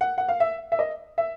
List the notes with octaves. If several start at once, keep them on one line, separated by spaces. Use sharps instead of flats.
F#5
F#5
F5
E5
E5
D#5
E5